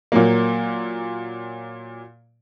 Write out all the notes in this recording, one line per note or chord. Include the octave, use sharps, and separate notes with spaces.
A#2 F#3 A#3